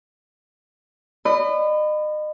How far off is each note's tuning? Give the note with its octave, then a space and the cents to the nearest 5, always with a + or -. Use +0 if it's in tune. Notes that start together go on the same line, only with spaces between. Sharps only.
D#5 -35 B5 +25